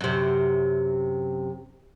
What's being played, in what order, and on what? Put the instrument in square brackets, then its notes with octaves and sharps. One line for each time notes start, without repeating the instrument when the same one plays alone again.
[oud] F#2 C3